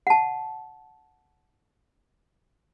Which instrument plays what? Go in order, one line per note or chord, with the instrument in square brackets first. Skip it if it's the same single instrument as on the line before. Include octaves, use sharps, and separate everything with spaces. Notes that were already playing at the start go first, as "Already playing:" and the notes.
[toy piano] F#5 A5